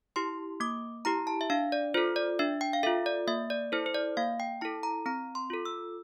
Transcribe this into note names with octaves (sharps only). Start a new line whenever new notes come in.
E4 G4 C6
A#3 D6
E4 G4 A#5
A5
E5
D4 F5
D5
F4 A4 C5
D5
D4 E5
G5
F5
F4 A4 E5
D5
A#3 E5
D5
E4 A4 C5
C5
D5
A#3 F5
G5
E4 A4 A5
A#5
C4 A#5
C6
F4 A4
E6